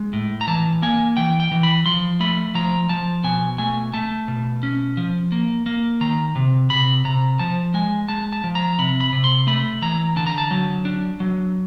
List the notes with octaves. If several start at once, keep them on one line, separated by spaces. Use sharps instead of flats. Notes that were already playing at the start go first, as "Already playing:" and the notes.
Already playing: G#3
A2
A#5
E3 A5
A#3 G#5
E3 G5
G5
E3
B5
F3 C6
A3 B5
F3 A#5
F3 A5
B2 G#5
A3 G#5
A3 A5
B2
C#4
F3
A#3
A#3
D#3 A#5
C3
C3 B5
C3 A#5
F3 A5
G#3 G#5
G#3 A5
A5
F3
A#5
C3 B5
B5
C3
C6
A3 B5
E3 A#5
D3 A5
A#5
A5
F#3
D4
F#3